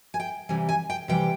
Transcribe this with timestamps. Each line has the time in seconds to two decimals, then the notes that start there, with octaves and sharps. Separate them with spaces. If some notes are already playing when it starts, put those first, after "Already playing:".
0.14 G#5
0.20 G5
0.49 C3 E3 G3 G#5
0.69 G#5
0.90 G5
1.08 C3 E3 G3 G5